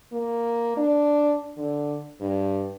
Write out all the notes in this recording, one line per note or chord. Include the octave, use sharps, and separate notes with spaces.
A#3
D4
D3
G2